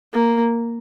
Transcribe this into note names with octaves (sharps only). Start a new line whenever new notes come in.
A#3